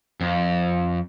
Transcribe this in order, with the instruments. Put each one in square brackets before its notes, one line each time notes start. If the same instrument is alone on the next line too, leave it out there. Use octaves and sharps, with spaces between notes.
[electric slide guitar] F2